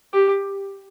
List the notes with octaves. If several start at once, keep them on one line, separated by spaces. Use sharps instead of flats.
G4